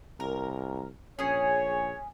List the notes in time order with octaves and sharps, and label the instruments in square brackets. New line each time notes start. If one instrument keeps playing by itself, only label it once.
[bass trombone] C2 [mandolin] A#4
[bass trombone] A#1 [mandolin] C#4 G#4 [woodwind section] C#5